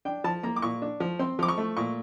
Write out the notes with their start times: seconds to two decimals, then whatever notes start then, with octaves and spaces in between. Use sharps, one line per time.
0.05 D4 G5
0.24 F3 A5
0.43 A#3 A#5
0.56 D6
0.62 A#2 C#6
0.82 D4
1.00 F3
1.19 C4 C6
1.39 F3 D6
1.48 C#6
1.58 A3
1.77 A#2 C#6